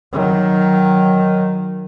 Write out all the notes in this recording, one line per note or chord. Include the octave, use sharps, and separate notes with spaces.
D#3 F#3